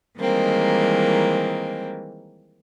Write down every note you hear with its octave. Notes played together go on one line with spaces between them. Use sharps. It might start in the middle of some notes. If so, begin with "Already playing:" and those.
D#3 E3 G3 G#3 A#3 C4